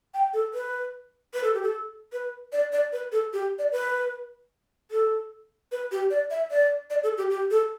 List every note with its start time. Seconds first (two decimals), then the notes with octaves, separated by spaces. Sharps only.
0.14 G5
0.34 A4
0.54 B4
1.34 B4
1.44 A4
1.54 G4
1.62 A4
2.13 B4
2.52 D5
2.72 D5
2.93 B4
3.12 A4
3.33 G4
3.59 D5
3.72 B4
4.91 A4
5.72 B4
5.92 G4
6.10 D5
6.30 E5
6.51 D5
6.90 D5
7.03 A4
7.18 G4
7.30 G4
7.51 A4